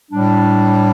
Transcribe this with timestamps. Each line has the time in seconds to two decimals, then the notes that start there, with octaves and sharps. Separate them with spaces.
0.11 A2 G3 D4